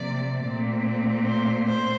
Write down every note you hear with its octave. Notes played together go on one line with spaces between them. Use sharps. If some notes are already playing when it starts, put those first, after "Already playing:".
Already playing: C3 F3 A#3 D5
A#2 A3 C4
C5
C5